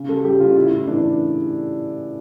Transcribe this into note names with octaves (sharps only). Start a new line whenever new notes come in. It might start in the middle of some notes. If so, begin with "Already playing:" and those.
Already playing: C#3
G3 A4
G3 G4
C#3 F4
A2 E4
A2
E3 D4
E3